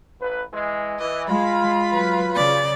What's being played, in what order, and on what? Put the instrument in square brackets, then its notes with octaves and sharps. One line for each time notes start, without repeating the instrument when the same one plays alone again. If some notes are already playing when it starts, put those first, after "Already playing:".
[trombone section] A1 B4
E3 G#3
[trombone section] E3 [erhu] D#5
[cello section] G#3 [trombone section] F4 [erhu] B5
[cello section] F#3 B4
[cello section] C#3 [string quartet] D5